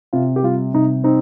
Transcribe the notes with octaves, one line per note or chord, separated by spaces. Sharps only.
C3 F4
G4
G3 F4
C3 D#4
C4 D#4